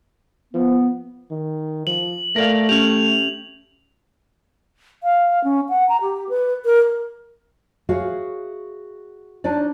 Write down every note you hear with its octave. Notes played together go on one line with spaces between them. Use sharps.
F3 B3
D#3
F3 F#7
A3 A#4 D5 F5
C#4 G4 F7
F5
C#4
F#5
A#5
G4
B4
A#4
F#4 G#4 C#5 E5 F5
D4 D#4 C#5 D5